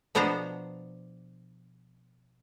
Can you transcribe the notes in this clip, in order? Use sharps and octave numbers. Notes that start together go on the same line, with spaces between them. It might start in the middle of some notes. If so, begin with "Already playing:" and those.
B2 F3 B3 D4 C5 A#5